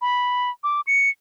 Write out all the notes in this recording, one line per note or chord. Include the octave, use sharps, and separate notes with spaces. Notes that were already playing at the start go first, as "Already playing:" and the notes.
B5
D6
C#7